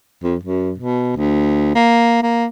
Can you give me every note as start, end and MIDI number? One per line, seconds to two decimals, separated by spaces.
0.23 0.36 41
0.44 0.73 42
0.79 1.12 47
1.17 1.70 38
1.75 2.20 58
2.23 2.46 58